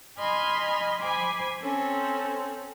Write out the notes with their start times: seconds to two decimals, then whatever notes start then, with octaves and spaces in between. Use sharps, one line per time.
0.18 D#5 G#5 B5 C6 F6
1.01 C5 G#5 B5 D6
1.62 C4 C#4 A4